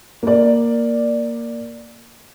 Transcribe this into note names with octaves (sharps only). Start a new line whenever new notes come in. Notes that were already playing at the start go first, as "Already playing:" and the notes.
A#3 D5